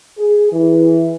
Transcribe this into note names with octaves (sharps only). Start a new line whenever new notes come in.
G#4
E3